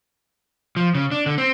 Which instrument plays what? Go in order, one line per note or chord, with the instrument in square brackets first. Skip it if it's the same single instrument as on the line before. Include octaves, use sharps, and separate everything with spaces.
[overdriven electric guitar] F3
C#3
D4
D3
C4